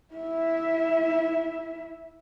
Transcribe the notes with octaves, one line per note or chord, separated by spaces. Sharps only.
E4 E5